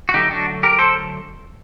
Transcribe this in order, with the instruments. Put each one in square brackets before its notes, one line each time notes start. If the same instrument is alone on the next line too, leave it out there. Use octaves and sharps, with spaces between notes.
[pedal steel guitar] F#4
D3 F#3 A3 D#4 G4
D4 F#4
G4 A#4
A4 C5